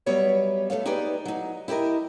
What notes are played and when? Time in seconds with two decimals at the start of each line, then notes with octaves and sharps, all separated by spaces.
0.06 F#3 G3 B3 B4 C#5 E5
0.70 A3 A4 B4 F5
0.86 D#4 G4 G#4 B4 D5
1.25 F#3 D#4
1.68 E4 G4 A4 A#4 D#5